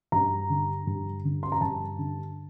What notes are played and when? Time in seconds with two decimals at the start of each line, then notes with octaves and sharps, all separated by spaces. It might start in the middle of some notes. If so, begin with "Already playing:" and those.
0.12 G2 A#5
0.49 D3
0.87 G2
1.24 D3
1.43 C6
1.52 A#5
1.61 G2 A5
1.98 D3